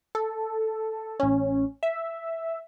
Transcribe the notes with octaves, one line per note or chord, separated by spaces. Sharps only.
A4
A1 C#4
E5